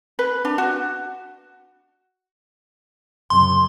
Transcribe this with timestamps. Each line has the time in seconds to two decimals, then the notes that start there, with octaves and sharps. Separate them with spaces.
0.19 B4
0.45 D4
0.58 F#4
3.30 F#2 C#3 C6